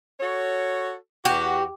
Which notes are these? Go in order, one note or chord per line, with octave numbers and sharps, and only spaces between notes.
F#4 A4 C#5
E2 F#4 G4